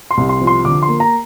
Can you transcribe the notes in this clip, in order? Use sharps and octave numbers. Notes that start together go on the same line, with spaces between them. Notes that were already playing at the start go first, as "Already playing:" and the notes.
C6
C2
C6
F3
C6
D3 D6
C6
A#3
A#5